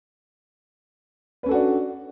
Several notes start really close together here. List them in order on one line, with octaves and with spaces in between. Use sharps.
B4 C#4 A4 F#4 D4